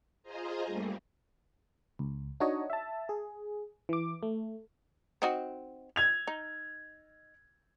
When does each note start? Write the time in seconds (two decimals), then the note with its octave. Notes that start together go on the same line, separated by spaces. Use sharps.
0.23 F4 G#4 C5 D#5 G#5 A#5
0.66 G2 G3 A3 A#3
1.99 C#2
2.40 D4 D#4 F#4 C#5 D#5
2.70 E5 A5
3.09 G#4
3.89 E3 D6
4.23 A3
5.22 C4 D#4 F#4
5.96 G#6 F7
6.27 D#4